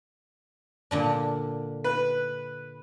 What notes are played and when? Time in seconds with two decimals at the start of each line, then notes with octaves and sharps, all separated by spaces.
0.91 A#2 D3 D4
1.84 B4